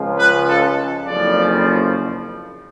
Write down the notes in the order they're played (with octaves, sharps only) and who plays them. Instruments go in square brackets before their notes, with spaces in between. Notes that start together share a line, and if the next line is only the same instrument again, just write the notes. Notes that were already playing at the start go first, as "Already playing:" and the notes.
Already playing: [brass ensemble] C#2 C#3 F3 G#3
B4
A4
F#1 F2 C#3 F3 D5